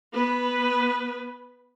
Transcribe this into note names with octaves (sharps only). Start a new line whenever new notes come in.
B3 B4